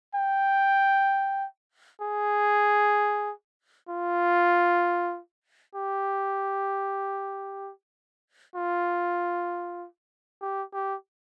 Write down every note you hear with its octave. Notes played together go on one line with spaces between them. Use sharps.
G5
G#4
F4
G4
F4
G4
G4